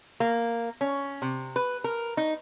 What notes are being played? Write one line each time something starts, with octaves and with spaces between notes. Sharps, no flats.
A#3
C#4
C3
B4
A#4
D#4